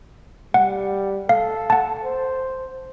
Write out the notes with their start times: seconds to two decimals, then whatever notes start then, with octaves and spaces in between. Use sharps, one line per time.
0.54 G3 F#5
1.29 A4 F5
1.70 F#5 A5
2.04 C5